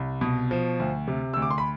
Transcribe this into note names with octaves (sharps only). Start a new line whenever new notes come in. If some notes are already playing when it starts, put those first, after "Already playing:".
Already playing: C2
B2
F3
D2
C3
D2 E6
D6
C6
B5